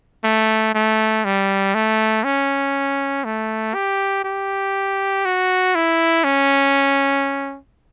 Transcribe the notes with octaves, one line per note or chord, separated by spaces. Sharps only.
A3
A3
G3
A3
C#4
A3
G4
G4
F#4
E4
C#4